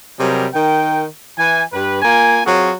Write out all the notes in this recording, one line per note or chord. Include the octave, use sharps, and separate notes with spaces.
C3 F#3 G3 G#4 A#4
D#3 A#4 G5
E3 G#5
G2 G4 B4
A#3 F4 G#5
F#3 C4 F4 F#4 G#4